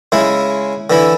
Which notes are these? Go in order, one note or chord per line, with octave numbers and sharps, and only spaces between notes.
C#3 G#3 E4
D3 E3 E4